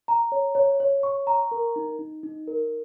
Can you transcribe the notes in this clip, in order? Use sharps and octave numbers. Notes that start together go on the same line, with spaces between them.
A#5
C#5
C#5
C#5
C#6
A#5
A#4
D#4
D#4
D#4
A#4